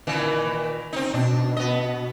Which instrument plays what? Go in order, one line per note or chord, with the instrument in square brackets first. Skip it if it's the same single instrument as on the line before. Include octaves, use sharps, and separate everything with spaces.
[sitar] A#2 D#3 E3
C4 D#4
[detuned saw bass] B2 [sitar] D4
[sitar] B3 D#5